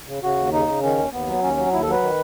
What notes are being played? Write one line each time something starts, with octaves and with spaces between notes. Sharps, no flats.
C#3
C#3 F#4
D#2
C#3 D#4
C#3
D#3 C#4
D#2
D#2 B3
F#3
D#2 C#4
F#3
D#2 E4
A4
F#3 B4
D#3